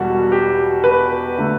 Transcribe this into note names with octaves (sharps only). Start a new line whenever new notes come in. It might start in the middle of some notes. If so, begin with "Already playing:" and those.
Already playing: E1 E2 B2 G3 F#4
G4
B4
D3 A3